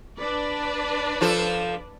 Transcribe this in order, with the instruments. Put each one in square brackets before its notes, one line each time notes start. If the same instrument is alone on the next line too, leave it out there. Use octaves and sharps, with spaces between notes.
[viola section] D4 B4 D5
[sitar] F3 F4 A4